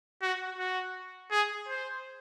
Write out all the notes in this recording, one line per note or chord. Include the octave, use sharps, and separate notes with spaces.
F#4
F#4
G#4
C5